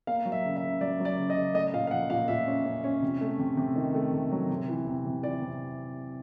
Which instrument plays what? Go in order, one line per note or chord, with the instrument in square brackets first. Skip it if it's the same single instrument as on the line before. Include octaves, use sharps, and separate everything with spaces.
[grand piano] A#3 F5
F#3
E5
C#3
E5
C#3
F#3 D5
F#3
D5
C#3
D#5
C#3
A3 D#5
A#2 F5
F5
F3 F#5
A#2 F5
A#2 E5
C#4
C#4
C#4
C3
A3
C3
C3
D#3
A3
C3
F#3
C3
E3
C3
C3
E3 D5
C3